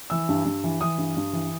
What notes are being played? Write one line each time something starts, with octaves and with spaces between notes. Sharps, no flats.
E3 E6
G2
G2
E3
E3 D#6
G2
G2
E3